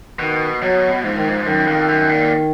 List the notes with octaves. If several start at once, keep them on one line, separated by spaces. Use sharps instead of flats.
B2 D#3
B2 F#3
G#2 F3
D#3
F3
F#2 D#3
F2
F#2
A#2